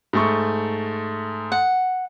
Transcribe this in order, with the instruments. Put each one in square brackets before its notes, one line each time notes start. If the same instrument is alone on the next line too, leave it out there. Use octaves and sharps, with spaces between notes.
[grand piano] G#2 A3 C#6
[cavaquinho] F#5